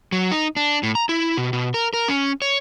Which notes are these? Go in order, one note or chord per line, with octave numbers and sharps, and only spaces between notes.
F#3
D#4
D4
A2
A#5
E4
B2
B2
A#4
A#4
C#4
C#5